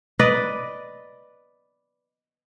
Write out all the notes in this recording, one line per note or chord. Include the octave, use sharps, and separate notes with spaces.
B4 D5 D#5